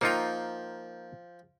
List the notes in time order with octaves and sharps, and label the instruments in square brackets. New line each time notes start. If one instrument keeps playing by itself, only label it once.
[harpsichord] F3 G5 [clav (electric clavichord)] A#3 D#4 F4